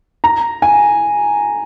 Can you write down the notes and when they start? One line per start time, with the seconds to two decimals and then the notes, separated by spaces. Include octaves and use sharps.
0.24 A#5
0.62 G#5